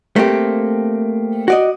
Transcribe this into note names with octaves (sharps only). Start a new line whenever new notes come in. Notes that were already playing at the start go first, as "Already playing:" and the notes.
A3 A#3 C4 G4
F#4 D5 D#5